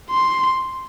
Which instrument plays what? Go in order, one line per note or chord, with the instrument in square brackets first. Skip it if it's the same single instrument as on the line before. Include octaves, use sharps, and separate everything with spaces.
[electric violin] C6